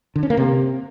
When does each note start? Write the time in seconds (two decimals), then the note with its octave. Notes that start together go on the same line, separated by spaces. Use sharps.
0.16 D3
0.23 C#4
0.30 A#3
0.37 C3